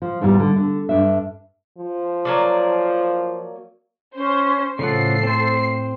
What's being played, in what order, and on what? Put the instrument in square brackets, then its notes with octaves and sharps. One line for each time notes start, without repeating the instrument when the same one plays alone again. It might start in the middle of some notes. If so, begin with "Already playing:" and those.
[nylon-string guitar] F3
F2 G#2 B2 E3 G3
D3
D3
G2 D4 E5
[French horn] F3
[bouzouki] F#3 A#3 D5
[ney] C#4 [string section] C5
[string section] A2 C7 [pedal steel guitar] C#3 F3 F#5 [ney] A4
[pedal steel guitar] C4 C5